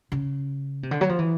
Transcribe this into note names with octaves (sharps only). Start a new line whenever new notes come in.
C#3
C3
D3
F#3
F3
E3